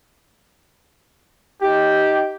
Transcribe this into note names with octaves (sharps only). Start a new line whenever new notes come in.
D#4 G4